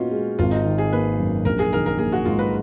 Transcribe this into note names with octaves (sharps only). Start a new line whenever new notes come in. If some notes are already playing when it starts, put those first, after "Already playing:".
Already playing: A#2 B3 C#4 D#4 F4 F#4
G#3
G#1 F4
D#4
D#3
G#4
A#3 B4
F#2
A#1 A#4
G#4
D#3 A#4
A#4
A#3 G#4
F#4
G#2 F4
B4